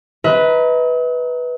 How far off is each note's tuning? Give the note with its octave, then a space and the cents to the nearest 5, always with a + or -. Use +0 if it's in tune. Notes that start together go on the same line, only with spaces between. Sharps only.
B4 +0 D#5 +45 A#5 +0